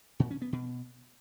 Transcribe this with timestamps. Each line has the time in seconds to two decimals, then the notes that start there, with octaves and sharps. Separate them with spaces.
0.20 A#2
0.31 C#4
0.42 B3
0.53 B2